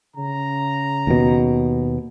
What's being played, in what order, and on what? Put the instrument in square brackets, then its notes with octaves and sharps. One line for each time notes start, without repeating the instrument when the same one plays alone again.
[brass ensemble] C#3 A#5
[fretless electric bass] D#2 B2